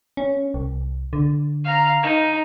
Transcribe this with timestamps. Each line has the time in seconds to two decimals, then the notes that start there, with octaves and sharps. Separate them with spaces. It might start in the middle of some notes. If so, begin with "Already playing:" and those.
0.17 C#4
0.54 C2
1.13 D3
1.65 F5 A#5
2.03 D#4